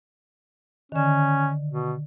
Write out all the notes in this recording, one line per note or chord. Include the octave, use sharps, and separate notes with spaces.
D3 D#3 C#4
B2